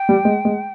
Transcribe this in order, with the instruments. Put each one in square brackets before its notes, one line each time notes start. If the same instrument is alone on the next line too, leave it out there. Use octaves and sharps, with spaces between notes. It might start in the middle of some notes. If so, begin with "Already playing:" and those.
Already playing: [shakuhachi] G5
[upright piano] G3
G#3
G#3